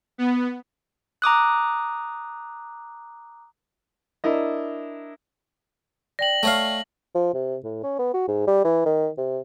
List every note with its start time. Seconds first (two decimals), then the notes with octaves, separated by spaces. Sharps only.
0.18 B3
1.22 A#5 D6 D#6 F#6
4.24 D4 E4 A#4 D#5
6.19 D5 G5 A#6 F#7
6.43 A3 C#5 F5
7.15 F3
7.34 C3
7.64 A2
7.83 C#4
7.99 B3
8.14 F#4
8.28 G#2
8.47 G3
8.64 E3
8.86 D#3
9.18 C3